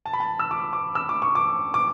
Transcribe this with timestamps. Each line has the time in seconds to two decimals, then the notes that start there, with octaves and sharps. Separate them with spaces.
0.06 A5
0.13 B5
0.20 A5
0.39 E6
0.51 D6
0.73 D6
0.95 E6
1.09 D6
1.22 C#6
1.35 D6
1.74 D6